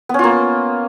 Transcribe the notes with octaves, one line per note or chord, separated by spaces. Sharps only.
A#3 B3 C#4 F4